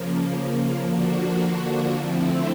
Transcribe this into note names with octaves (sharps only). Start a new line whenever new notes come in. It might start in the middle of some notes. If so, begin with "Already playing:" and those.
Already playing: C#3 F3 A#3
D3 F3 A#3 D4 F#4
D3 F3 A3 C4 E4